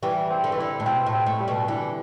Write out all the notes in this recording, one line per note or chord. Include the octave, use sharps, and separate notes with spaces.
E3 G3
C4
D3
E3
D3 E4
A2
B2 C4
A2
C4
A2
G3
B2
D3 E3